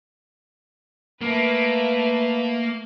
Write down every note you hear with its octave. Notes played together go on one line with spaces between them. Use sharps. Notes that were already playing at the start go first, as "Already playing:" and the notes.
A3 A#3 B4